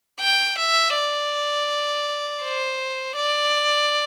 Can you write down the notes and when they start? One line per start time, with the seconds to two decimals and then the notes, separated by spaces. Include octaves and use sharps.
0.20 G5
0.58 E5
0.94 D5
2.42 C5
3.16 D5